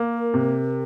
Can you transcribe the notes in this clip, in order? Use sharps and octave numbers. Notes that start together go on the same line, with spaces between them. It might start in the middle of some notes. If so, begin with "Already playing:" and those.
Already playing: A#3 A#4
C3